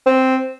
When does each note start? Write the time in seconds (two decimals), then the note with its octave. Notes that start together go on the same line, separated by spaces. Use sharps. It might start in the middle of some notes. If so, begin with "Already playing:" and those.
0.06 C4